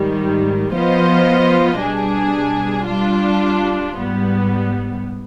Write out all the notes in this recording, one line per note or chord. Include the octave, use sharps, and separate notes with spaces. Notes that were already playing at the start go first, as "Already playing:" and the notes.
Already playing: G#2 D#3 G3
F3 B3 F4 C5 D#5
B2 G3 D4 G#4
G3 D4 F4
G#2 G3 B3